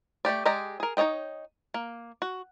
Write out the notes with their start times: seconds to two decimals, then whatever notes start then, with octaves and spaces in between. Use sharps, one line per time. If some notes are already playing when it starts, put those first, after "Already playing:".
0.25 A3 A#3 G4 D5
0.45 G#3 G4 D5 D#5 A#5
0.80 G#4 A#4
0.97 D#4 A#4 C#5 D#5 G5
1.74 A#3
2.22 F#4